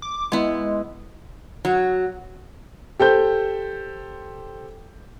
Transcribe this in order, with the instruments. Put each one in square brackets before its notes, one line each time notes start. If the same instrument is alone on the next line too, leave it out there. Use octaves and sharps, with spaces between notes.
[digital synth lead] D6
[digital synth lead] G#3 [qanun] B3 E4
[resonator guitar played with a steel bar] F#3
[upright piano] G4 A4 C5 G6